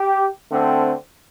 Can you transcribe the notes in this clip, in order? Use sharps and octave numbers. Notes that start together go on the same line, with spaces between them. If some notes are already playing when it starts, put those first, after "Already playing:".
Already playing: G4
D3 A3 C4